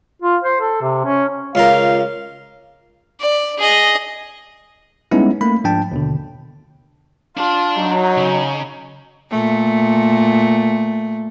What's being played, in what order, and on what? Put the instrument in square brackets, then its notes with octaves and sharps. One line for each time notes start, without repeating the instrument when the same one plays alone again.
[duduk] F4
C5
A4
C3
C#4
[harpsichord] C#2 F4 A#4 [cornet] F5
[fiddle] D5
G#4 D#5
[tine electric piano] G3 G#3 B3 C#4 D#4 E4
A3 A#3 B5
G#2 F3 D4 G5 A5
D#2 B2 D3
[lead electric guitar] D4 A5 [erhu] F4
[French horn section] F#3 [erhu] D#4
[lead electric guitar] C#3
[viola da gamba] A#2 A3